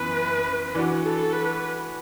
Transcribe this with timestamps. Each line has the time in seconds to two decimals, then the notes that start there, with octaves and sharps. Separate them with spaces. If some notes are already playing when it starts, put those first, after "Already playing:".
Already playing: F#2 E3 B3 B4
0.75 E3 D4 F#4
1.04 A4
1.33 B4